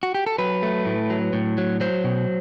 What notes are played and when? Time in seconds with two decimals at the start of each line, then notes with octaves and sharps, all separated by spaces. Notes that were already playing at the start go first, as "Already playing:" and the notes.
0.03 F#4
0.15 G4
0.26 A4
0.38 F#3 B4
0.63 A3
0.86 A2
1.10 F#3
1.33 A2
1.58 F#3
1.80 F#3 C5
2.04 B2